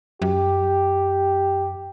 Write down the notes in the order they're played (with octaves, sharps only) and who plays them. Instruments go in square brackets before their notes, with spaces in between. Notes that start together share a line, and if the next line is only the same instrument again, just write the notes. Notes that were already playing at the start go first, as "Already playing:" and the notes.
[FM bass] F#2 [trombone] G4